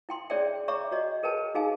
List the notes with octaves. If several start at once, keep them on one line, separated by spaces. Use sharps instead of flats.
E4 G5 C6
C#4 G#4 C#5 D5 E5 G5
C#5 E5 A#5 C#6 D6
F#4 C#5 D#5
G#4 A#4 B4 G5 A5
D#4 F#4 G#4 F5 G#5